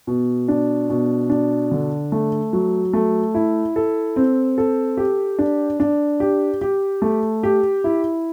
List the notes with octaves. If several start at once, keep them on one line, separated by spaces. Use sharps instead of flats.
B2
D4
B2
D4
D3
A3
F#3
A3
E4
A4
C4
A4
G4
D4
D4
G4
G4
A3
G4
E4